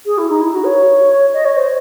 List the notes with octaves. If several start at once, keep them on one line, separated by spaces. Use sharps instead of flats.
G#4
E4
D#4
E4
F#4
C#5
D#5
C#5
C5